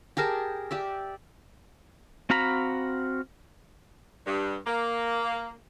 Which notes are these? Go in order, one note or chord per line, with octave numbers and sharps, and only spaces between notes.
G4 G#4 A#4 A5
G4 D5 E5
C4 F#4 F5 A#5 B5
G2
A#3